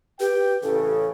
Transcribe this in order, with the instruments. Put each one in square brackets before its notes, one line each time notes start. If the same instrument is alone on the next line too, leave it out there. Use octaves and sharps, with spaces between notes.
[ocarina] G4 [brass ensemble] B4 G5
[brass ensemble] A1 C#3 [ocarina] A4